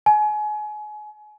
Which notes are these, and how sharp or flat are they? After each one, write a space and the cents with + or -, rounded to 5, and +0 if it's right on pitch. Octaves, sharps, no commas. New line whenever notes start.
G#5 +30